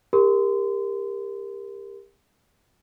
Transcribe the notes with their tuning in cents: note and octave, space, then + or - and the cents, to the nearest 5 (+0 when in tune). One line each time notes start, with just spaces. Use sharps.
G4 +30 A#4 +0 C6 -35